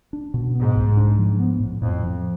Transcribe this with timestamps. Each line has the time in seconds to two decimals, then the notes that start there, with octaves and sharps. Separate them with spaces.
0.13 D4
0.34 B2
0.55 G#2 B3
0.76 C2
0.97 D4
1.18 F3
1.40 B3
1.60 A2
1.82 F2 A2
2.03 F3